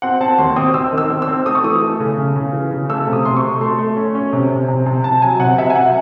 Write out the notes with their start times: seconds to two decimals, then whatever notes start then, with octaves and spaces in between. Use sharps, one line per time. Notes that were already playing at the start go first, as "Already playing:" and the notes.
0.02 C4 F#5
0.21 C4 A5
0.38 D#2 C6
0.56 C4 D#6
0.74 C4 E6
0.92 D#3
0.98 E6
1.10 C4
1.22 E6
1.28 C4
1.46 A3 D#6
1.55 C#6
1.64 E3 D#6
1.82 A3
2.00 C#3
2.18 C#3
2.36 C#3
2.53 E3
2.71 C#3
2.89 A3 E6
3.07 C3
3.13 D#6
3.25 C3 C6
3.37 C#6
3.43 A3
3.61 A3 C6
3.79 A3
3.97 C#4
4.15 C#4
4.33 C3
4.50 C3
4.68 C3
4.86 C3
5.04 C3 A5
5.22 F#3 G#5
5.40 C3 F#5
5.58 C3 E5
5.70 G#5
5.75 F#2 F#5